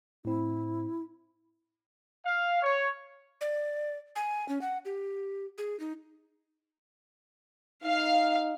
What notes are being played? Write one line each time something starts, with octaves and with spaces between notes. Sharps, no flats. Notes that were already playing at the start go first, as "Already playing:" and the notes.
A2 C4 E4
F5
C#5
D5
G#5
C#4
F#5
G4
G#4
D#4
D#4 F5